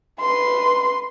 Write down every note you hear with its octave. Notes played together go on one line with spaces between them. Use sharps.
B4 C6